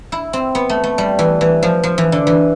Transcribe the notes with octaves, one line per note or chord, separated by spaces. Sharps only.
E4
C4
B3
A3
A3
G3
E3
E3
F3
F3
E3
D3
E3